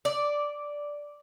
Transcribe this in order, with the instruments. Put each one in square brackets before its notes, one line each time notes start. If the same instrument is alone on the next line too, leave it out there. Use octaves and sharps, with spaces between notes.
[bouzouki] D5